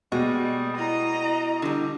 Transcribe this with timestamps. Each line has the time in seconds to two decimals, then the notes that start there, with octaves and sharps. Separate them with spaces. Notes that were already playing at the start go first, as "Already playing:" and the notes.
0.12 B2 G3 G#3 A#3
0.78 E4 D#5 A#5
1.62 D3 G3